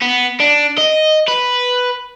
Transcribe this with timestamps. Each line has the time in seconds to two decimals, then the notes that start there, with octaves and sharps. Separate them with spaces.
0.02 B3
0.40 D4
0.78 D#5
1.28 B4